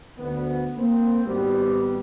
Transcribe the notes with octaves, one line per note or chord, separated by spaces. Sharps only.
D2 B3
A#3 C4
G#1 G3 B3